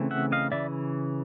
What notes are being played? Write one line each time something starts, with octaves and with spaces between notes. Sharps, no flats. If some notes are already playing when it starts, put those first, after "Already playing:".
Already playing: C#3 E3 A3 C4
E5 F#5
D#5 F5
C#3 E3 D5 E5